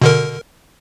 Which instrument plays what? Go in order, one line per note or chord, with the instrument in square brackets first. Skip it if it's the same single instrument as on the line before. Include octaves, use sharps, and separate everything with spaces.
[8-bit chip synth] B2 D3 A#4